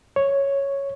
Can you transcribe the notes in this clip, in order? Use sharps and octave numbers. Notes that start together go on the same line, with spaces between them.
C#5